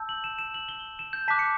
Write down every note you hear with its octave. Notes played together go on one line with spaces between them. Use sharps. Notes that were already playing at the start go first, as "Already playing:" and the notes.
Already playing: A5 E6 G6
F#7
E7
E7
F#7
G7
E7
G6
A5 D6 F#6 B6
C#7